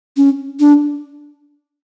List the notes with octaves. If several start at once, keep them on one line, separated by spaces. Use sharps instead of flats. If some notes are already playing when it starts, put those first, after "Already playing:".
C#4
D4